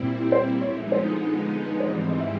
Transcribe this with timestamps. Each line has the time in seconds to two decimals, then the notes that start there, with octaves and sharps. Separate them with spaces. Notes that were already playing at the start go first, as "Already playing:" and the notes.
Already playing: A#2 G3 C4 E4
0.32 C5
0.61 D3 F3 G#3 B3 D#4 C#5
0.77 E5
0.92 C5
1.66 B4
1.80 G#2 E3 G3 C4 C5
1.96 D5
2.10 D#5
2.20 E5